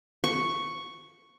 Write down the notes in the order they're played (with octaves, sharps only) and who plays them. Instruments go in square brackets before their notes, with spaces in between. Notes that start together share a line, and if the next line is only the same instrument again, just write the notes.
[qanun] C#6